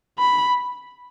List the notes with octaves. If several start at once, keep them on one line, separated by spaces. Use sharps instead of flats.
B5